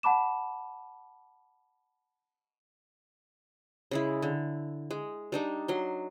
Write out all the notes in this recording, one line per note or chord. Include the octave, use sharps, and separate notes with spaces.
F#5 A5 B5 D6 E7
C#3 G#3 E4
D3
G#3
G3 D4 D#4
F#3 C6